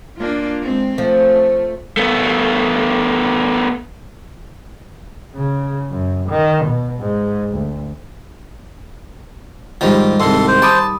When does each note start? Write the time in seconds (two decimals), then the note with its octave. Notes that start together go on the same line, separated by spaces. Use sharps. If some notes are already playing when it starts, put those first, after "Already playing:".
0.16 A#3 D4 F4
0.61 G#3 C4
0.98 F3 A3
1.97 A3 B3
5.35 C#3
5.91 F#2
6.29 D#3
6.65 B2
6.99 G#2
7.53 D2
9.81 G#2 D#3 F3 G3
10.20 C2 G#2 A4 C6
10.48 C5
10.62 A5 B5 D6 D#6